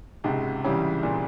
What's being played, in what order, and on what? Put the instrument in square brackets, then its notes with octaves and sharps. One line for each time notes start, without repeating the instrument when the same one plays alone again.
[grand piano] C#2 [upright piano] G#2 C3
[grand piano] C#3 E3 G3
[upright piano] A#2